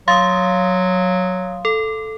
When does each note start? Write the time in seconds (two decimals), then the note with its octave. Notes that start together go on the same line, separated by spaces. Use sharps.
0.08 F#3 F5 C6 D#6 A6
1.65 A4